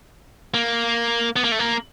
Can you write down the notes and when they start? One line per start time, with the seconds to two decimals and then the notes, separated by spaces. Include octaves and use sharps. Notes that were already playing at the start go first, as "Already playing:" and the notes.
0.54 A#3
1.36 B3
1.44 A#3
1.52 A3
1.59 A#3